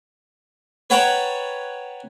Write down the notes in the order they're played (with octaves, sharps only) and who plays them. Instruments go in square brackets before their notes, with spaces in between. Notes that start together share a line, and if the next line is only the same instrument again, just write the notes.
[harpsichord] B4 C#5 F#5 G5 A5 A#5